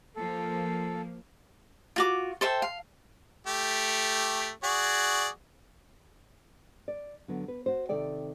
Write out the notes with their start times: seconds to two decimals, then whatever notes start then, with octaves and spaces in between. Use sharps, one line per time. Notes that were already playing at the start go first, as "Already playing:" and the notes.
0.16 F3 A#3 A4
1.96 F4 F#4 D6
2.41 A4 C5 E5 G5
2.62 F5
3.47 A3 G4
4.63 F#4 G#4 D5
6.88 D5
7.28 D3 F#3 B3
7.48 B4
7.66 F#4 C5
7.89 C3 D#3 A4 D5 G5